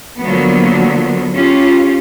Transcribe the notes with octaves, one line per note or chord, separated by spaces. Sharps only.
D3 F3 F#3 A#3 B3
C#4 F4 G4